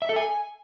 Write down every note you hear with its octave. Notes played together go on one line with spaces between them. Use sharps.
E5
A4
G#5